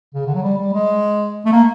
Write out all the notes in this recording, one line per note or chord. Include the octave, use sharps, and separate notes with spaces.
C#3
D3
F#3
G3
G3
G#3
A3
A#3